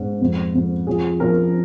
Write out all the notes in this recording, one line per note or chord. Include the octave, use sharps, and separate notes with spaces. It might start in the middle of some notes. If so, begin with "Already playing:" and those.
Already playing: G#2
F2
F2
F3 G#4
F3 A#4